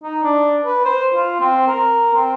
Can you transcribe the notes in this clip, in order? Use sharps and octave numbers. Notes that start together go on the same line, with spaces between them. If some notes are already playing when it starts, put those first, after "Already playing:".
D#4
D4
B4
C5
F4
C4
A#4
C4